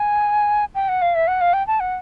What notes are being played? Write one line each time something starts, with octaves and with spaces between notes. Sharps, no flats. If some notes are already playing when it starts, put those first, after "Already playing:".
Already playing: G#5
G5
F#5
F5
E5
F#5
F5
G5
A5
F#5